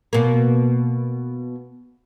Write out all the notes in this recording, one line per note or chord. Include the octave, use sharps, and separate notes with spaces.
B2 A#3